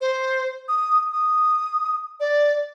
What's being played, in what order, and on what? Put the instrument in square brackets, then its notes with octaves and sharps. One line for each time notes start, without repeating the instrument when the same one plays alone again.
[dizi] C5
D#6
D#6
D5